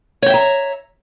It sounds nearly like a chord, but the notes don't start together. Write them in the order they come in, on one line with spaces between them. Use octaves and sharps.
C#5 G5 E5 A#5